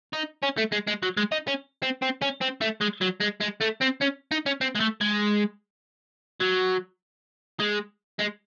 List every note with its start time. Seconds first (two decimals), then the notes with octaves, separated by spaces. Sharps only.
0.13 D#4
0.43 C#4
0.58 A3
0.72 G#3
0.88 G#3
1.03 F#3
1.17 G#3
1.32 D#4
1.47 C#4
1.83 C4
2.02 C4
2.22 C#4
2.42 C4
2.62 A3
2.81 G#3
3.02 F#3
3.21 G#3
3.41 G#3
3.61 A3
3.82 C4
4.02 C#4
4.32 D#4
4.46 C#4
4.61 C4
4.75 G#3
4.80 A3
5.01 G#3
6.40 F#3
7.60 G#3
8.19 G#3